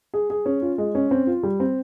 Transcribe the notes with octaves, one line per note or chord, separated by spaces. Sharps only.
G#4
G#4
C#4
F4
G#3
C#4
C4
F4
G3
C4